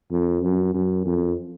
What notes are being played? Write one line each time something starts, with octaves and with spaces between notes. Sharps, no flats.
F2
F#2
F#2
F2